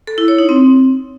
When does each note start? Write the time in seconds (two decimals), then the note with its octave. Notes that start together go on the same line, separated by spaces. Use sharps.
0.07 A4
0.18 E4
0.28 C#5
0.38 D#4
0.49 C4